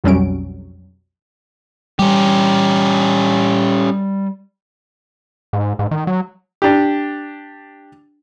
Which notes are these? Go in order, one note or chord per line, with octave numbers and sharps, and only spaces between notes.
B1 F2 F#3 G3 C#4 D7
G3 C#4 G4
G#2
G#2
D#3
F#3
D4 G4